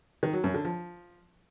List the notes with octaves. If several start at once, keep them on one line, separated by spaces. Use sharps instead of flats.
D#3
F#3
F#2
D3
F3